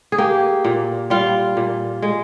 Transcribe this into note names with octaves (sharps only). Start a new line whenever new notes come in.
G#4
A#3 G4
A#2
G3 F4
A#2
G#3